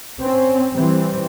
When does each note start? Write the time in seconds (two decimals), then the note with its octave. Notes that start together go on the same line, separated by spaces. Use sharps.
0.19 C4 C#4
0.75 E3 G3 C4